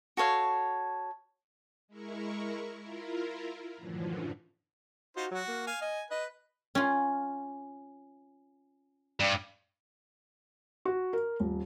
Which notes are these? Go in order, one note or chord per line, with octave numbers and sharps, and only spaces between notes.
F#4 A4 C#5 F5
G#3 E4 A#4 C#6
E4 F4 A#4
F#2 A2 D3 E3 F3
D#4 F4 F#4 C5
F#3 F#4
A#3
F5 G#5
D#5 G#5
B4 D#5
C#4 F4
G2
F#4
A#4
D#1